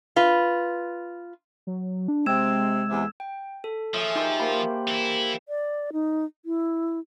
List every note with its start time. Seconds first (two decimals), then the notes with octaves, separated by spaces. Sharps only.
0.16 F4 B4
1.67 F#3
2.08 D4
2.26 C3 G#3 C4 E6 G#6 E7
2.89 E2 C3
3.20 G5
3.64 A4
3.94 F3 G#4 C#5 E5
4.15 D#4 G4 A#4 G5 C6
4.40 A#3 G4 C5 B5
4.88 E3 E4
5.48 D5
5.93 D#4
6.45 E4